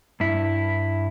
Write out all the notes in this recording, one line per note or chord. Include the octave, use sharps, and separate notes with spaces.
G2 E4